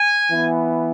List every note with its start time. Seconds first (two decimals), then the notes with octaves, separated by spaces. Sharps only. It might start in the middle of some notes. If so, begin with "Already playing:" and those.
Already playing: G#5
0.30 E3 B3